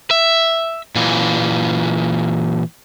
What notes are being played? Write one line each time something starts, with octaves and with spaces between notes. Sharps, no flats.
E5
A#2 E3